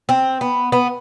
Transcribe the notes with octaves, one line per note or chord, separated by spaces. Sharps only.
C4
B3
B3